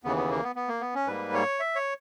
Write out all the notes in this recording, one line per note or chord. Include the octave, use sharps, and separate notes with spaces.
D#2 C#3 E3 B3
B3
A#3
B3
B3
A#3
B3
C#4
G#2 G3 A#3 B4
C#5
E5
C#5